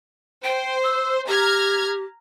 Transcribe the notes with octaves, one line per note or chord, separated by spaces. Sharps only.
C5 G5
E6
G4 A#5 F6 G#6